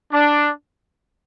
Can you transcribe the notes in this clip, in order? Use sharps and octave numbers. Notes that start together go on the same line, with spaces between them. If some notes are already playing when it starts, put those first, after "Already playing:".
D4